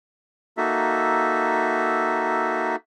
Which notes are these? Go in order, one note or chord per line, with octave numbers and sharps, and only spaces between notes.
A#3 D#4 F#4 A4 E5